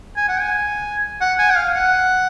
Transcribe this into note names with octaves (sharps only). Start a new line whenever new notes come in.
G#5
F#5
G#5
F#5
G#5
F#5
F5
F#5